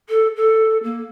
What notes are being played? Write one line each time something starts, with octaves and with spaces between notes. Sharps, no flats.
A4
A4
A#3